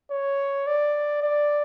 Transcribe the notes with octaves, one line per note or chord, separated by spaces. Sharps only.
C#5
D5
D5